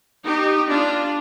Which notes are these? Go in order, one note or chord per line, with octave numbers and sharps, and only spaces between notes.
D#4 G4
D4 F4